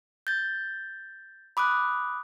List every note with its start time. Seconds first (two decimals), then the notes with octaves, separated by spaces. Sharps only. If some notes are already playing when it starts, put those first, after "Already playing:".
0.27 G6 A6
1.57 B5 D6 D#6 F#6